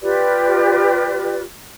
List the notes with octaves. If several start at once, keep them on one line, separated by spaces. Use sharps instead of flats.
F4 G4 B4 D5